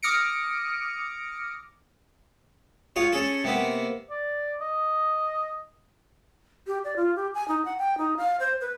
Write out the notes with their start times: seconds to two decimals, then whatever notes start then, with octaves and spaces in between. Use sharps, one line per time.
0.03 D6 D#6 F6 A#6 C#7 D7
2.96 F4 G#4 C#5
3.12 C#4 G#4 A4
3.44 C3 A#3 B3
4.10 D5
4.61 D#5
6.67 G4
6.84 D5
6.96 F4
7.16 G4
7.35 G#5
7.48 D#4
7.65 F#5
7.78 G5
7.98 D#4
8.17 F5
8.40 C5
8.61 B4